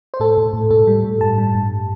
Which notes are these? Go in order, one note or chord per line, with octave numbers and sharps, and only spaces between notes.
C5
A2 A4
A2
A2
A2 A4
G3
A2
G2 A5
G3
G2